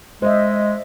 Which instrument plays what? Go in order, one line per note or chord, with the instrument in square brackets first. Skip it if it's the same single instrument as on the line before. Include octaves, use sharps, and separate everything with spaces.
[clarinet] G#3 [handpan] C5 D#5 E5